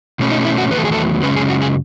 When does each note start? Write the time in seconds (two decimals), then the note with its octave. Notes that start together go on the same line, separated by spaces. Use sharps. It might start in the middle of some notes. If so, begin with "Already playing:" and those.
0.19 B2 A3 C#4
0.31 D#4
0.45 E4
0.58 F#4
0.70 E2 D#3 F#3 A3 B4
0.78 A4
0.85 G#4
0.92 A4
1.23 F#2 C#3 G#3 C#4 B4
1.36 G#4
1.49 F#4
1.62 G#4